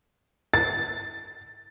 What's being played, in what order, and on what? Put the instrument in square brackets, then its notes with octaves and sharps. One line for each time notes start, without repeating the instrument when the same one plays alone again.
[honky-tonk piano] A6